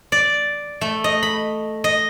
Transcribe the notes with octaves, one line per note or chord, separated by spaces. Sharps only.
D5
A3
D#5
B5
D#5